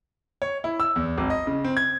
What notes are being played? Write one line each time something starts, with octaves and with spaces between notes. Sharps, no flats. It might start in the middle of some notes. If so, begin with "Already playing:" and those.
C#5
E4
E6
E2
G#1
D#5
C#3
C4
G#6